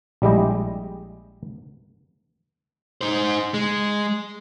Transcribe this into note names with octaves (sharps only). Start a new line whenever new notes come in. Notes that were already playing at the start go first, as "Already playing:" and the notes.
A#1 G3 G#3 E4 G4 D#5
D#4 C5
G#3